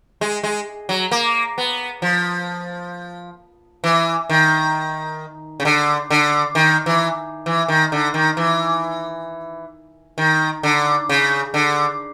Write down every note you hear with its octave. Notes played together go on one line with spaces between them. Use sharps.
G#3
G#3
F#3
A#3
B3
F3
E3
D#3
C#3
D3
D3
D#3
E3
E3
D#3
D3
D#3
E3
D#3
D3
C#3
D3